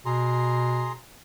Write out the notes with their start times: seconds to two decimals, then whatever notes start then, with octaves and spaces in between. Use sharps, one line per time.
0.06 B2 G#4 A#5 C6